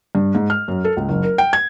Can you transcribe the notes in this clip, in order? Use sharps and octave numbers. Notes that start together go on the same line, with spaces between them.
G2
G#2
F6
F#2
A4
C#2
F#1
A#4
G5
G#6